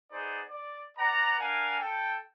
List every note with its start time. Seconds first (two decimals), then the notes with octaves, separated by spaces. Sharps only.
0.11 B3 D#4 G#4 C5 D5
0.50 D5
0.97 B4 D5 F#5 A#5
1.39 D4 A#4 F5 F#5 G#5
1.80 A4 G5